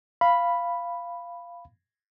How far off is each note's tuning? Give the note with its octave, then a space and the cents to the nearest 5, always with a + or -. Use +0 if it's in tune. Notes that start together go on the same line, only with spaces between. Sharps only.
F5 -10 B5 +0